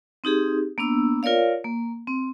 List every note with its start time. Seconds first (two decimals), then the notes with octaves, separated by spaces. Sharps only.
0.24 C4 D#4 G4 G#4
0.78 A#3 B3 D4 E6
1.23 F4 A#4 C#5 D5 F5
1.64 A#3
2.07 C4